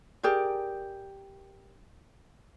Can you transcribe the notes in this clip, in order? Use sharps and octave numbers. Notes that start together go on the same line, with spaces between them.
G4 G#4 A#4 D5